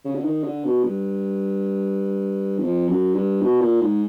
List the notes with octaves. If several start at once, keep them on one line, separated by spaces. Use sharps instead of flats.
C#3
D3
D#3
D3
B2
G2
E2
F2
F#2
G2
B2
A#2
G#2